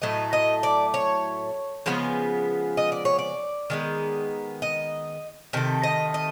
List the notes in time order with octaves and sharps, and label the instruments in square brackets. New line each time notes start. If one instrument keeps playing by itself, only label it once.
[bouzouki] A2 F#3 A3 D#5
D#5
D5
C#5
C#3 F3 G#3 B3
D#5
D5
C#5
D5
D#3 G#3 B3
D#5
C3 D#3 A3
D#5
D#5